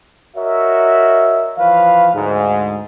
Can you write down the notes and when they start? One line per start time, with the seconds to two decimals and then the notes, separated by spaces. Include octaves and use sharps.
0.36 F#4 A#4 C#5 D#5 E5
1.58 E3 F3 B4 C#5 F5
2.15 D2 G#2